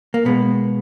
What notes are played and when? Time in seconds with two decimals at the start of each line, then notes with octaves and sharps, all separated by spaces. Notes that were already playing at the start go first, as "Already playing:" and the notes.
0.14 A#3
0.25 B2 G#3 B3